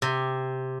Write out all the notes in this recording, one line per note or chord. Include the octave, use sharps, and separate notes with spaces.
C3